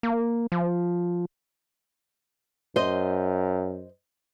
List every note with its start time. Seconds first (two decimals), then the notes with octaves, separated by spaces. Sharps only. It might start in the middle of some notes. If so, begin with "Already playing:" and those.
0.03 A#3
0.52 F3
2.76 F#2 C5 D#5